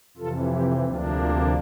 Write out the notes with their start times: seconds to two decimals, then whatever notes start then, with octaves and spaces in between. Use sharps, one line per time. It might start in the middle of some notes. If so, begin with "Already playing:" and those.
0.17 F2 C3 E3 F4 A4
0.52 G4
0.85 D2 C3 F3 A#3 D4 F4
1.20 F4